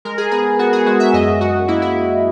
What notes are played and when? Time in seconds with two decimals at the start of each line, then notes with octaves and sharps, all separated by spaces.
0.05 G#3 A#4
0.18 G#4
0.31 B3 G#4
0.59 B3 F#4
0.73 G#4
0.86 G#3 F#4
1.00 E5
1.13 F#2 D#5
1.41 F#2 F#4
1.68 A#3 E4
1.82 E4